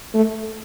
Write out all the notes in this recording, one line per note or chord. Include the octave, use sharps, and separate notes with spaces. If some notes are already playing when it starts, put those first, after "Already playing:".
A3